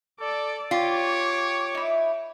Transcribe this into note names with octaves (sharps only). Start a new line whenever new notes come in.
A4 D5 D6
F4 G4 C#5 D6
D#4 E4